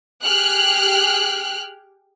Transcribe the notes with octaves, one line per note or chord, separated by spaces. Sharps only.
G4 G#4 G5 F6 F#6